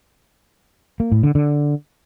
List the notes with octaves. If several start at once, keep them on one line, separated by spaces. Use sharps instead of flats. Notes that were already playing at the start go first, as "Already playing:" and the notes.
A#3
A2
D3
D3